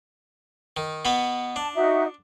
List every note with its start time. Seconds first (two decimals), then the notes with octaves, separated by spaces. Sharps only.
0.77 D#3
1.05 B2 B3 B5
1.56 D4 A5
1.74 D#4 F#4 E5